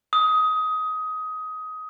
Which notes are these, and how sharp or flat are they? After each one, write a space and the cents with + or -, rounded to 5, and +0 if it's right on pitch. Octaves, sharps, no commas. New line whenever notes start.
D#6 +15